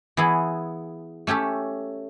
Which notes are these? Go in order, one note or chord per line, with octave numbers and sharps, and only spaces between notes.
E3 B3 E4 G#4
A3 C#4 G4 A4